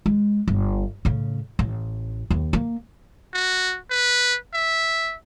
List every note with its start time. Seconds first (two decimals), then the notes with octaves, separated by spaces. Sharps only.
0.06 G#3
0.48 G1
1.05 A2 C#3
1.59 A1
2.30 D#2
2.53 A#3
3.33 F#4
3.91 B4
4.54 E5